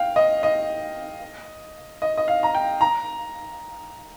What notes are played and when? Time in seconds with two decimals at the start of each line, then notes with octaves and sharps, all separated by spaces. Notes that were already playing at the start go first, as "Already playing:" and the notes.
Already playing: F5 G5
0.16 D#5
0.43 D#5
2.02 D#5
2.17 D#5
2.28 F5
2.43 A#5
2.55 G5
2.81 A#5